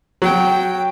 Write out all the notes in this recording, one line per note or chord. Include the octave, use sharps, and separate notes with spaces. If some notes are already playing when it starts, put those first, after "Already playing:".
F#3 G5